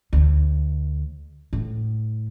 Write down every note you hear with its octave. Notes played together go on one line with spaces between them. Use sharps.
D2
A2